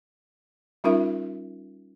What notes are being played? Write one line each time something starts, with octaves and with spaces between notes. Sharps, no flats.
G3 C#4 D#4 F4 A#4 E5